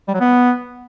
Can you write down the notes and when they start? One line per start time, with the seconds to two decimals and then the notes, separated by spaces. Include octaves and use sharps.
0.08 G3
0.14 F#3
0.20 B3